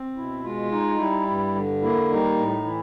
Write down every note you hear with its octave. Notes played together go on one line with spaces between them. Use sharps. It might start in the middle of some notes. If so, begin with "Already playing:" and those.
Already playing: C4
B2 E4
G#3 F4
D#4
G3 E4
G2
D3
A#3 E4
G3 D#4
A2
E3 E4